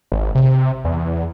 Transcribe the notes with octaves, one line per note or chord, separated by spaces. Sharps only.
G#1
C3
E2